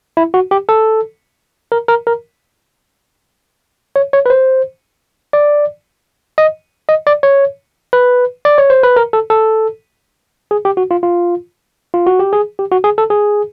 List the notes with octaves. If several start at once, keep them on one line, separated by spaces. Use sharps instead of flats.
E4
F#4
G4
A4
A#4
A#4
A#4
C#5
C#5
B4
C5
D5
D#5
D#5
D5
C#5
B4
D5
C#5
C5
B4
A#4
A4
A4
G#4
G4
F#4
F4
F4
F4
F#4
G4
G#4
G4
F#4
G#4
A4
G#4